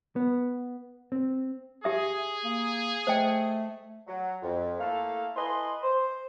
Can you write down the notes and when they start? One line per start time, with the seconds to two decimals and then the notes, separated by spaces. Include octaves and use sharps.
0.16 B3
1.12 C4
1.84 G4 G#4 E5 D#6
2.44 A#3
3.07 A3 C5 D#5 G5
4.07 F#3
4.43 F2
4.79 A3 A#3 E4 A4 F5
5.36 E4 A4 B4 D#5 G#5 C6
5.83 C5